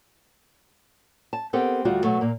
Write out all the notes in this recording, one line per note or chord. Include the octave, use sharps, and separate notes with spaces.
A5
B3 C4 G4 A4 A#4
D2 G3 F4 F#4
B2 F#3 A3
A#2 A#3